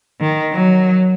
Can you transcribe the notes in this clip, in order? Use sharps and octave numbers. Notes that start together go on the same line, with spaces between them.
D#3
F#3